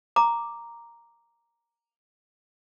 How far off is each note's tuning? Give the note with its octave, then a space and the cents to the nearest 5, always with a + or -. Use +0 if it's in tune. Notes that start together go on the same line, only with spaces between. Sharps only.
A#5 +0 D6 +0